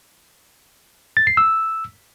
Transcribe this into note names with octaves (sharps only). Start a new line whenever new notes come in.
A6
C7
E6